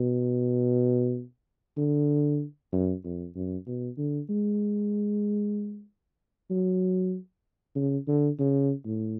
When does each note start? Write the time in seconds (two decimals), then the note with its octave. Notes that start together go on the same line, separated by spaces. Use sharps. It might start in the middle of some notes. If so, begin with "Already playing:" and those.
Already playing: B2
1.77 D3
2.72 F#2
3.04 F2
3.35 F#2
3.67 B2
3.98 D3
4.30 G#3
6.50 F#3
7.76 C#3
8.08 D3
8.39 C#3
8.86 A2